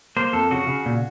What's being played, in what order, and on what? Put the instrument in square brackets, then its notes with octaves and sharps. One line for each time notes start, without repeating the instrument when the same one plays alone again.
[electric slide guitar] A#3 C5
F2 A4
C#3 F#4
C#3
A#2